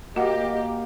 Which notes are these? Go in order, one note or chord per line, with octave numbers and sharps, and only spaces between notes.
A#3 F#4 G4 D#5 F#5